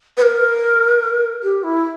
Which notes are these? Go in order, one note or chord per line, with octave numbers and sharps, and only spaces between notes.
B4
A#4
G4
E4